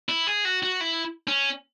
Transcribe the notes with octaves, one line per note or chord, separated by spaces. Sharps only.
E4
G#4
F#4
F#4
E4
C#4